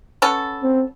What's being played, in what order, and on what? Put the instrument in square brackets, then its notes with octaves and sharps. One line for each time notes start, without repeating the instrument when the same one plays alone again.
[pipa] B3 C#4 A4
[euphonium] C4